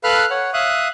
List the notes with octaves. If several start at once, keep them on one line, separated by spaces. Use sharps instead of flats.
A4 B4 F5 B5 F6 F#6
C#5 F#5
E5 F5 D#6 F#6